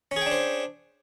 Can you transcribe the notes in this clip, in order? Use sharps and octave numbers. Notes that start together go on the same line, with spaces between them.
C#4 D4 G#4 C5 G5